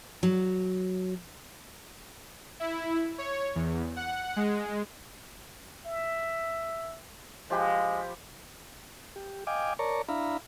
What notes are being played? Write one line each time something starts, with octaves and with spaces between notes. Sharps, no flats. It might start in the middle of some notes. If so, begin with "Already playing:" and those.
F#3
E4
C#5
E2
F#5
G#3
E5
F3 G#3 G4 B4
G4
D#5 F5 G5 G#5 D6
A#4 C#5 D5 A5 A#5 C#6
D4 E4 E5 F5 A#5 B5